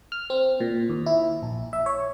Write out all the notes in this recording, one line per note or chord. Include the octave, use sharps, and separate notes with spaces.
F6
C4
A#2
D#2
E4
A#1
E5
C#5